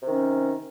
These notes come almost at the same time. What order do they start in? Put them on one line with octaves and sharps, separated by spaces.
C3 D#3 C#4